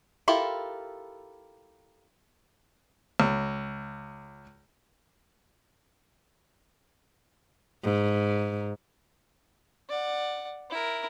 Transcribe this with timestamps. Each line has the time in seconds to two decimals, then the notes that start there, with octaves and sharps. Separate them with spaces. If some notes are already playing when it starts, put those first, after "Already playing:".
0.28 E4 F4 G4 A4 A#4
3.20 C#2
7.84 G#2
9.89 D5 F#5
10.70 E4 A#4